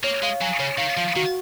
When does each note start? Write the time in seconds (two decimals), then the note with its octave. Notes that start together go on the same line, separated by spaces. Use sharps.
0.03 A#3 C#5
0.22 G#3 F5
0.41 F#3 G#5
0.59 C#3 C#5
0.78 D#3 F5
0.97 F3 F5
1.16 D#3 F#4